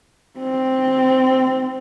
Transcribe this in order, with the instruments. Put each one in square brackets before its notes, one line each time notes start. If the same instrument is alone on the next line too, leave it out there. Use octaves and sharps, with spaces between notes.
[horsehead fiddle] C4